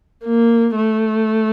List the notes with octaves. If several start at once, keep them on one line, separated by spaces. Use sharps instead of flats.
A#3
A3